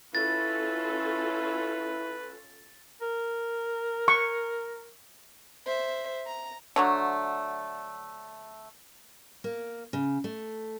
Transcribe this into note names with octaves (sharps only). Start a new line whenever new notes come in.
C#4 E4 F4 A4 B4 A6
A#4
C#6
C5 E5
A#5
D3 F#3 A3
A#3
C#3
A3